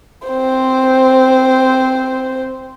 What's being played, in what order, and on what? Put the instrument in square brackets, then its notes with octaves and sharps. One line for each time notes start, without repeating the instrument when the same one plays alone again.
[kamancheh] C4 C5